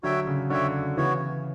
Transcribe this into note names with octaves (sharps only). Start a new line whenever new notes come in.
D3 F#3 F#4 C#5 E5 G5
C#3
D3 F#4 C#5 E5 G5
C#3 E3 B3 F#4 C#5